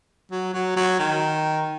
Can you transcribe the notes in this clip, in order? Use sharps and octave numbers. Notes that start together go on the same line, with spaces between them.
F#3
F#3
F#3
D#3